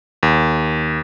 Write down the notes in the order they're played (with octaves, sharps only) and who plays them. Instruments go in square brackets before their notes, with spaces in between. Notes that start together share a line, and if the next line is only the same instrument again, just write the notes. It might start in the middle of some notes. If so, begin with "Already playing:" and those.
[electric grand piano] D#2